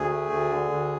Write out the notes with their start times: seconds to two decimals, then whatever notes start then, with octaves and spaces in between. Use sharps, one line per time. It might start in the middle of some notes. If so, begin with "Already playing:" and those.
Already playing: D2 G#4
0.10 A3
0.30 D2
0.50 D3
0.71 D2